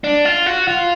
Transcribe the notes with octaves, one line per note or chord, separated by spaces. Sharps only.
D4
F4
F#4
F4